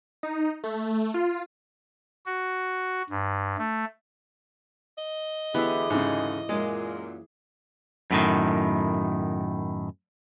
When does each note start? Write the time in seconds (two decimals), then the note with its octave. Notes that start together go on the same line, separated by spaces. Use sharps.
0.23 D#4
0.64 A3
1.14 F4
2.26 F#4
3.10 G2
3.58 A3
4.98 D#5
5.54 D2 D3 E3 B3 G4 G#4 B4 E5
5.90 G#2 C#3
6.49 F#2 A#2 G#3 G#4 D6
8.11 F#2 A2 D#3